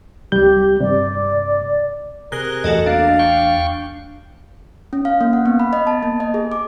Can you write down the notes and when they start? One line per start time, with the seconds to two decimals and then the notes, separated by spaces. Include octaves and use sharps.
0.32 C2 G3 G4 G6
0.80 G2 C3 D5
2.32 C3 G#4 A#4 F#6 A#6 G7
2.64 E2 A3 F#4 A4 D#5
2.86 A#3 D4 F5
3.19 G5 C#6
4.93 C#4
5.05 F5
5.21 A#3
5.33 F#5
5.46 B3
5.60 B5
5.73 D#5
5.87 A5
6.03 A#3
6.20 D#5
6.34 G#4
6.52 D6